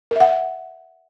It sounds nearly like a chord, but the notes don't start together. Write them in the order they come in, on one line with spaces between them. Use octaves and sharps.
A#4 E5 F#5